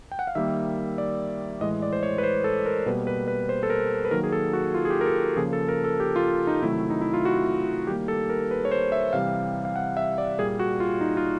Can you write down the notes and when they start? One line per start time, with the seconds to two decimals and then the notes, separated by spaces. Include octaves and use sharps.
0.12 G5
0.19 F#5
0.27 F5
0.35 D#3 G3 A#3 E5
0.98 D5
1.61 A2 E3 G#3 D#5
1.82 D5
1.93 C5
2.03 C#5
2.18 B4
2.23 C5
2.44 A4
2.66 A#4
2.86 B2 G3 A#3 B4
3.07 B4
3.28 B4
3.49 C5
3.63 A4
3.70 A#4
4.05 B4
4.11 D#3 F#3 A#3 A#4
4.23 G#4
4.32 A4
4.53 F#4
4.74 F4
4.85 G#4
4.90 G4
5.01 A#4
5.06 A4
5.37 C#3 F3 A#3 G#4
5.53 A4
5.68 A#4
5.84 A4
6.00 G4
6.16 F4
6.47 D#4
6.62 C3 D#3 F#3 A3 E4
6.90 D#4
7.01 E4
7.14 F4
7.25 F#4
7.87 D#3 G3 A#3 G4
8.08 A4
8.29 A#4
8.51 B4
8.65 C#5
8.71 C5
8.92 E5
9.13 C3 E3 G3 F5
9.65 F5
9.76 F#5
9.97 E5
10.18 D5
10.38 A#2 G3 A#3 G#4
10.59 F#4
10.80 F4
11.01 D#4
11.17 F4